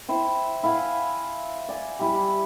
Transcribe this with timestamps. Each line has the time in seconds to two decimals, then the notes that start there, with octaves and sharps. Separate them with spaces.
0.09 E4 C5 G5
0.63 E4 F5 F#5 G#5
1.69 D5 G#5
1.99 G3 E4 G4